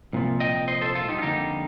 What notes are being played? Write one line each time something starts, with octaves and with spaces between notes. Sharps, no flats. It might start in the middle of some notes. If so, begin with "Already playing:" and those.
C2 A#2 F3
D#5 G5
C5 D#5
A4 C5
F4 A4
D#4 G4
F4
F2 D3 G3 A#3 D#4 G4